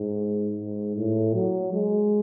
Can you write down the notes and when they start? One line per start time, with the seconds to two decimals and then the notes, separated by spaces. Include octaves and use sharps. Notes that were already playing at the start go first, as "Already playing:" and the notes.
Already playing: G#2
0.57 G#2
0.96 A2
1.34 F#3
1.73 G#3